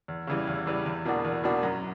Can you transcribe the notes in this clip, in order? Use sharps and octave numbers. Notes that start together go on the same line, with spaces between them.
E2
C#3 E3 G3
E2
C#3 E3 G3
E2
B2 A#3 D4 F#4
E2
B2 A#3 D4 F#4
F#2